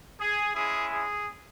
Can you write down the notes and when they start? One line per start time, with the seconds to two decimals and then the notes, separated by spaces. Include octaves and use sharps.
0.21 G#4
0.55 G#3 C#4 E4 G#4
0.92 G#4